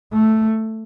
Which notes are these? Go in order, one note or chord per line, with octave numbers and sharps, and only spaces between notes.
A3